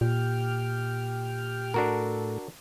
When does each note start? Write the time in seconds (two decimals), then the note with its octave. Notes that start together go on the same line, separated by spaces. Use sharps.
0.01 A#2 G4 G5 F6
1.74 A2 D4 F#4 A4 A#4